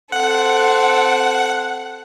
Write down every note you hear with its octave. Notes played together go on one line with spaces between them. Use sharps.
C4 A4 F#5